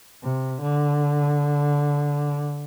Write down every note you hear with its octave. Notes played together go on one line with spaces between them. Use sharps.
C3
D3